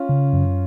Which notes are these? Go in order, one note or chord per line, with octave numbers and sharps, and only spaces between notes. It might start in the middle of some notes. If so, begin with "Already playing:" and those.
Already playing: C#4 F4
C#3
F#2